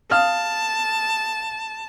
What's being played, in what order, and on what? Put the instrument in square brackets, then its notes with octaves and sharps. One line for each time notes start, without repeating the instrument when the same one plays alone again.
[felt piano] F5 D#6 F6 [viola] A5